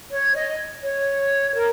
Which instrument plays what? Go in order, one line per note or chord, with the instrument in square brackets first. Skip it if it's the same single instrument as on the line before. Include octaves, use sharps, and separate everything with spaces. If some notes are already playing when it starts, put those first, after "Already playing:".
[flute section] C#5
D#5
C#5
A#4